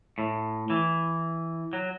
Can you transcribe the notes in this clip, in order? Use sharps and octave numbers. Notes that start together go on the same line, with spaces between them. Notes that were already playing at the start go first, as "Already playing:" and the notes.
A2
E3
F#3